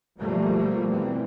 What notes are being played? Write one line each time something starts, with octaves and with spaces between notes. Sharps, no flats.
B2 F3 G3 A3 A#3
E3 C4